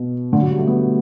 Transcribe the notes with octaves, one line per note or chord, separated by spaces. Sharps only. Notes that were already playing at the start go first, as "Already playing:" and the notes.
Already playing: B2
D3
F#3
G3
A3
B3